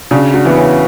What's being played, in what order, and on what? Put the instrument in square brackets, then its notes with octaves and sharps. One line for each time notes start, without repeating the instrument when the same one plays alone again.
[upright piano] C#3 [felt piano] D4 F#4
[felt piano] D4 F#4
[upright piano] E3 B3 F#4
[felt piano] C#4 E4